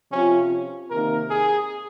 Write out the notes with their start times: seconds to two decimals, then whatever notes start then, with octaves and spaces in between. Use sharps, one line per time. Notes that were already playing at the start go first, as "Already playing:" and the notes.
0.12 C3 F3 C4 C#4 F4
0.90 C3 D#3 A#3 D#4 A#4
1.30 G#4